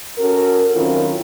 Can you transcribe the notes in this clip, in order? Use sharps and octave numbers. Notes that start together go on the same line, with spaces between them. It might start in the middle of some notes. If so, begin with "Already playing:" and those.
C#4 F#4 A4 A#4
D#3 F#3 C4 C#4 E4 F4